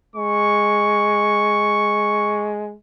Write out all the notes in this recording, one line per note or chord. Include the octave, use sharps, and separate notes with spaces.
G#3 C#6